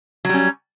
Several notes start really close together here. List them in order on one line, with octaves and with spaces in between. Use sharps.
F#3 G3 C#4